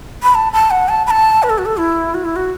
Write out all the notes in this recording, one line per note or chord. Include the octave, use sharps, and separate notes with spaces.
B5
A5
A5
F#5
A5
B5
A5
B4
A4
F#4
A4
E4
F#4
E4
F#4